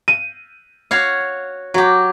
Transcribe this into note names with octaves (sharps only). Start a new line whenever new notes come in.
D#7
F#4 C#5 F5
F#3 F#4 G4